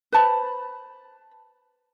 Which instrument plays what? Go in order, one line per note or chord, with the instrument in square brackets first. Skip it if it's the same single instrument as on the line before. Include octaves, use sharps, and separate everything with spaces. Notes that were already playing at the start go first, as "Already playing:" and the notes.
[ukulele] B4 C5 A5 B5